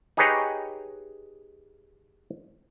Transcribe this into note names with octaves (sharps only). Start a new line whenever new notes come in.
D#4 G4 G#4 B4 C#5 D#5